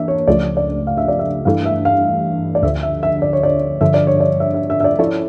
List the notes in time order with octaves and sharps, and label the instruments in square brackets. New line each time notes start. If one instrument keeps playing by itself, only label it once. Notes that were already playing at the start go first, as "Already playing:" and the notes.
Already playing: [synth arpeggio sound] E3 A#3 D4 [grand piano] E5
[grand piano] C#5
[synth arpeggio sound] C#2 C#3 F3 A3 [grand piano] D5
[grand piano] D5
F5
E5
D5
E5
[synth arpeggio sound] G2 E3 A3 D4 [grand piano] F5
[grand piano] E5
F5
D5
[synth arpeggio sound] D2 D3 F3 [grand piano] E5
[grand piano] E5
E5
D5
C#5
D5
[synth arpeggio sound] G2 D3 F3 [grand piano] E5
[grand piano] D5
C#5
D5
E5
E5
E5
E5
D5
[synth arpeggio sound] F3 C#4 E4 A4 C#5 [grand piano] D5